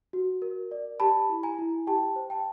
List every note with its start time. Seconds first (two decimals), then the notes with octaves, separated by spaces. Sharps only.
0.13 F#4
0.42 A#4
0.71 D5
1.00 G4 A5 B5
1.30 E4
1.43 G#5 A#5
1.59 E4
1.87 G4 G5 A5
2.16 C5
2.30 G5 A5